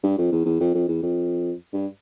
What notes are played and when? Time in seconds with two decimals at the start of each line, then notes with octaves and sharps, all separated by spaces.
0.03 G2
0.18 F2
0.32 E2
0.45 E2
0.60 F2
0.75 F2
0.88 E2
1.03 F2
1.73 G2